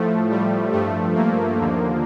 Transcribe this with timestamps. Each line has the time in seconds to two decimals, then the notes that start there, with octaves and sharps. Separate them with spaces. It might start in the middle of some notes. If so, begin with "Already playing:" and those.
Already playing: A2 F3 A3
0.30 G3
0.72 G2 F3 A3
1.15 A#3
1.58 D#2 D3 F3